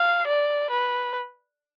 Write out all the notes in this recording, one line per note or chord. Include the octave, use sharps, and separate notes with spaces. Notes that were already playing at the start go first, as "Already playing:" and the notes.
Already playing: F5
D5
B4